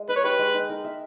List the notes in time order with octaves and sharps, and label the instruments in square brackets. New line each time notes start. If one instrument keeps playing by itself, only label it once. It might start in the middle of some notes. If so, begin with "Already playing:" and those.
Already playing: [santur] G#3
[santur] D#4 [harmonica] B4
[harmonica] C#5
[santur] G4 [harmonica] B4
[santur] G#3
D#4
A#4
E5